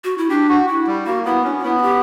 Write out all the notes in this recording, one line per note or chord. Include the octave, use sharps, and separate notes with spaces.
F#4
E4
D4 G4
F#4
E4
G3
A#3 F#4
B3 E4
C#4 D4
F#4
B3 E4
F#4
G4